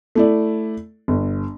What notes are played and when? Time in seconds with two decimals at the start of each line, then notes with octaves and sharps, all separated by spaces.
0.15 A3 E4 D5
1.08 G1